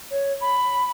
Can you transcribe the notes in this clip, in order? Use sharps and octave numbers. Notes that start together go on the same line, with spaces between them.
C#5
B5